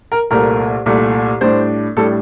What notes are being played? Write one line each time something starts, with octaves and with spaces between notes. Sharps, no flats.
A#4
C2 A#2 A3 A#4
C2 A#2 A3
A2 G3 D4 C5
A2 G3 D4 A4